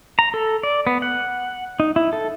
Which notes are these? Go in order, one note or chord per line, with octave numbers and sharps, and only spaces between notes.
A#5
A4
D5
B3
F#5
D#4
E4
A4